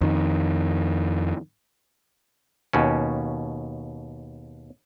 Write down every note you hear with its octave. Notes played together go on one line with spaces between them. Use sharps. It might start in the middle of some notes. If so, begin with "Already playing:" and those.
F2 D#3
D#2 B2 C#4